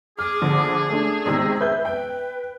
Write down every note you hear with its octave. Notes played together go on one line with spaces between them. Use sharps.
G#4 D6 F6
A#1 D3
A3 D4
C3 D#3 G#3 E6
B4 E5 G6
B4 G5